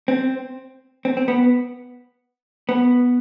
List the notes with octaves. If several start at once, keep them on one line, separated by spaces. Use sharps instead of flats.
C4
C4
C4
B3
B3